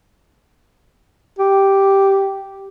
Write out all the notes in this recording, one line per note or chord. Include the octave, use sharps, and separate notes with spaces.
G4